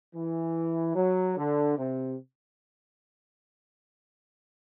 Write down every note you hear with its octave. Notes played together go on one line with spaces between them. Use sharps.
E3
F#3
D3
C3